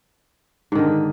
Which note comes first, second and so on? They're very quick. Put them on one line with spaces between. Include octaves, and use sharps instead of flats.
G#2 D#3 D3